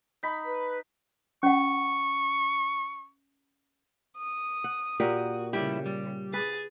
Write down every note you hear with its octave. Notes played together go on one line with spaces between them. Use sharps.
D#4 B5
B4
C#4 F#5 C#6
D#6
F#5
A#2 F#4 G4 A#4
C#3 G3 A3 E4 G4
G3
G#4 B4 A6